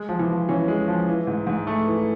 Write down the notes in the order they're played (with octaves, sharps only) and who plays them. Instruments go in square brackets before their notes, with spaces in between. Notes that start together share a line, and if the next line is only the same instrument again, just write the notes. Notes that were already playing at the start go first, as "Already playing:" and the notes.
Already playing: [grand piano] G#3
F3
[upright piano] E3
[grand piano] F3
[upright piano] E3 [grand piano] C#4
[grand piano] G#3
F3
E3
G#2
G#2
A3
E3